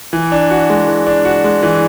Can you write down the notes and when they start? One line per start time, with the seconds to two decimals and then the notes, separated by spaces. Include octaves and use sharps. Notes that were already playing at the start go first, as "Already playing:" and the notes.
0.13 E3
0.32 D4
0.50 F#4
0.70 G#3
0.88 E3
1.07 D4
1.25 F#4
1.44 G#3
1.63 E3